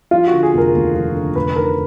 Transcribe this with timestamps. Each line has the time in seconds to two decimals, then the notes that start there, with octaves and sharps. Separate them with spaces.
0.11 F3 F4
0.27 D3 F#4
0.43 G#4
0.53 F1 A#4
0.74 D#2
0.94 F3
1.15 D3
1.35 F1 B4
1.56 D#3 A#4